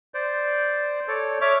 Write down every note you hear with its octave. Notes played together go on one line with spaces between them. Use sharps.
C5 D5
A4 C#5 D5
C#5 E5 D6 F6